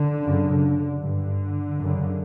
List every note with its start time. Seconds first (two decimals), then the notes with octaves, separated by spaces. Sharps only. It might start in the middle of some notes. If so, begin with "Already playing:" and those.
Already playing: D3
0.22 F#2 C#3
1.00 G2 D3
1.79 F#2 C#3